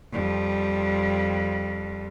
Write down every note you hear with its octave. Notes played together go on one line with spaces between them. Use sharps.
F2 G3